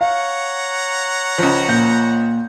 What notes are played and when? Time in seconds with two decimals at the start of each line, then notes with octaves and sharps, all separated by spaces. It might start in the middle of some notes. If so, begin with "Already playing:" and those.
0.01 C#5 F5 F#5 A#5
1.38 C#2 F3
1.68 A#2 G6